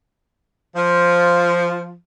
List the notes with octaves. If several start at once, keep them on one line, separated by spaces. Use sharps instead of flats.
F3